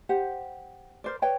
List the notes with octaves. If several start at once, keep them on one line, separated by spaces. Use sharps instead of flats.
G4 C5 F#5
A#4 C5 D5
B4 C#5 D5 G5